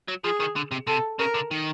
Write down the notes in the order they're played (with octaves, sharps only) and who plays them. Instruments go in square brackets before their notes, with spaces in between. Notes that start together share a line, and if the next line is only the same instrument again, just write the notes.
[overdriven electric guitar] F#3
[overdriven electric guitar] F3 [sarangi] G#4
[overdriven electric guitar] D#3
D3
C3
[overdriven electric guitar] C3 [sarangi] A4
[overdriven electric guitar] C#3 [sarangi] A#4
[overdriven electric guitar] D3
D#3